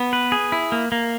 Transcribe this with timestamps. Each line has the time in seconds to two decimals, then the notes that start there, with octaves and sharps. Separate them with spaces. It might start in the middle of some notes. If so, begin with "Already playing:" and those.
Already playing: B3
0.13 B4
0.32 G#4
0.52 E4
0.72 A#3
0.92 A#3